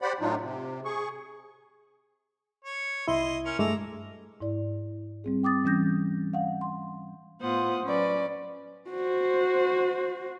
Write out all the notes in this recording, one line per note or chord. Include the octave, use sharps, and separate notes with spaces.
G4 C5 D5 F#5 B5
A2 F#3 D4 D#4 F4
C3
G#4 C#6
C#5
C2 E4 D#5 C6
C#4 A#4
G2 G#3 A3 A#5 D6 E6
G#2 E4 D5
G3 C4 G#4
G5 D6 D#6 A6
E3 G3 C#4 G6 A#6
F5 F#5
C6
A2 B3 F4 C5 F#5 D#6
F#3 C#4 B4 D5
F#4 C5